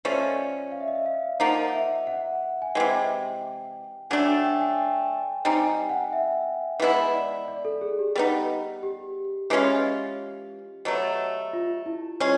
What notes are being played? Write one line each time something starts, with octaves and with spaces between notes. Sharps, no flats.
F3 A3 C#4 D5
D#5
D5
F5
E5
D#5
E5
F5
F3 A#3 D#4 F#5
E5
F#5
G#5
C3 E3 G#3 G5
D3 F#3 A3 D4 G#5
G5
G5
G#5
G5
G3 C4 D#4 G#5
G5
F#5
E5
E3 G#3 B3 E4 D#5
D5
D5
A4
G#4
G4
G3 B3 D#4
G4
E3 G#3 C#4 F4
B2 F#3 A3
F4
E4
G#3 C#4 F4